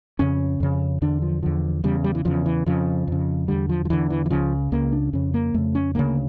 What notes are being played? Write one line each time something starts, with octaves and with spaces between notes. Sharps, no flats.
F2 C#3 C#4
F2 C#3
E2 D3 D4
F3
E2 D3 F3
E2 C#3 G3
G3
E3
E2 C#3 F3
E3
F2 C#3 F3
F2 C#3
E2 D3 G3
F3
F3
E2 D3 E3
E3
E3
C#2 C#3 F3
C#2 C#3 A#3
D4
F2 C#3 C#4
A#3
F2 C#3 A3
C#4
D2 C#3 A#3